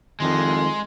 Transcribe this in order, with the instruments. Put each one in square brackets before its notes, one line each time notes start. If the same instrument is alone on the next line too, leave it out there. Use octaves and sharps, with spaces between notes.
[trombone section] C2 F2 [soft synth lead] D#3 [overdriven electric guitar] G#3 [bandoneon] C6